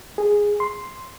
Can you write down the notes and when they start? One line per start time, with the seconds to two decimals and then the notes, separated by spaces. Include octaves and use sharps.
0.18 G#4
0.60 C6